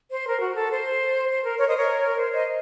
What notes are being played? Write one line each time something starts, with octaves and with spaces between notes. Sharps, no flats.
C5
A#4
F#4
A4
C5
C5
A#4
A#4 C#5
C5 D#5
A#4 C#5
C5
C5 D#5